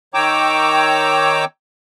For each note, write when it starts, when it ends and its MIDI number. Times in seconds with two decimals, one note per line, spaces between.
0.14 1.45 51
0.14 1.45 73
0.14 1.45 79
0.14 1.45 82
0.14 1.45 86
0.14 1.45 88